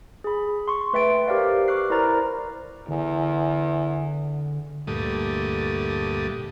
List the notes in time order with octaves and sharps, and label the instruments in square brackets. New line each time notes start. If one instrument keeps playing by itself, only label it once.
[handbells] G#4 B5
C6 C#6
A3 B4 E5 G5 A6 D7
G4 A#4 C5 D5 F5
B4 C#6 D6 F6 F#6 C7
E4 A#4 C5 D5 A#5 A6
[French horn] E2 [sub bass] D3
[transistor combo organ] D2 G2 A#2 G3 A3 D#6